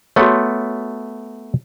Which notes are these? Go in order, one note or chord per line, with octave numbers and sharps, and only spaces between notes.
A3 B3 F#4 G#4 C#5